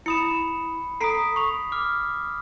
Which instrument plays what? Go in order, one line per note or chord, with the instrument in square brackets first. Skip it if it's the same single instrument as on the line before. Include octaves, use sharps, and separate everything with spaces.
[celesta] E4 D#6 E7 [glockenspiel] B5 C#7
[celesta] A4 A#5 D7 [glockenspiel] D#6 B6 C7
[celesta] C#6 F7
[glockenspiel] D6 F6